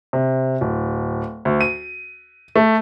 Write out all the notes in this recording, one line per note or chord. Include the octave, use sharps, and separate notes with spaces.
C3
D1
D2
D#7
A3